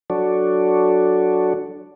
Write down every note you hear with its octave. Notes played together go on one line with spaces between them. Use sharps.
F#3 D4 F#4 A4 C#5 D5